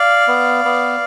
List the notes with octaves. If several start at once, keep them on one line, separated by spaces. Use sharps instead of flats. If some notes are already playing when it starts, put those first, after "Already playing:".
Already playing: D5 F5
B3
B3